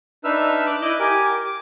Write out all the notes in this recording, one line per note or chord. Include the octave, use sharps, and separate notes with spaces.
D4 D#4 B4 E5 E6 F6
D6 F#6
E4 D#5 D6 F#6 G6
G4 A#4 G#5 D6
D6